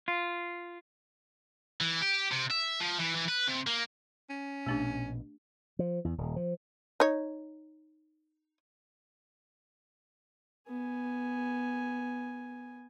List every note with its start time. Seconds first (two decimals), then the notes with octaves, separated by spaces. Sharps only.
0.08 F4
1.81 E3
2.02 G4
2.32 C3
2.51 E5
2.81 F3
3.00 E3
3.16 E3
3.29 B4
3.48 C3
3.67 A#3
4.30 C#4
4.66 A#1 B2 A3 D4 G4
5.79 F3
6.05 E2
6.18 D#1
6.36 F3
7.00 D#4 C#5
10.68 B3 G#5